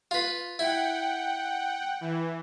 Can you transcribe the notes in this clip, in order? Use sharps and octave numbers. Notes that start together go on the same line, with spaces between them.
F4 B4
E4 F#5 G5
E3